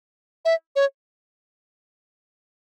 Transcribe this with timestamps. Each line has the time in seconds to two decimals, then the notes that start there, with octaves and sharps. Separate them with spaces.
0.45 E5
0.76 C#5